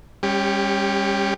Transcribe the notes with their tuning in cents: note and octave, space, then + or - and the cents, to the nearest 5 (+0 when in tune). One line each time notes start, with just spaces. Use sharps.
G3 +35 C#4 -10 G4 +0